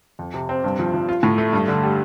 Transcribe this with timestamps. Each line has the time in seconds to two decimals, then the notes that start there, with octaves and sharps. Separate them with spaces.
0.19 F2
0.34 C3
0.49 C4
0.64 G2
0.79 F3
0.94 F3
1.09 F4
1.23 A2
1.38 A3
1.53 G2
1.68 D3
1.83 G3